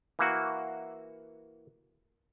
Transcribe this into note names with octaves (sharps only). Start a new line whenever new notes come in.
E3 A#3 F#4